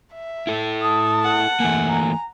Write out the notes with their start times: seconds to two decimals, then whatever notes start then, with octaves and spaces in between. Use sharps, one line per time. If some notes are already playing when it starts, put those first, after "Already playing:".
0.14 E5
0.47 E4 A4
0.82 A5 D#6
1.24 F#5
1.60 E3 A3 A#3 G#5
1.89 A#5